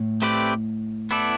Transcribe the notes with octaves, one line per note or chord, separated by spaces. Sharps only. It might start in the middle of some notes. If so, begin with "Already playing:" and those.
Already playing: A2
A3 C4 G4 B4 D5
B3 E4 A4 D5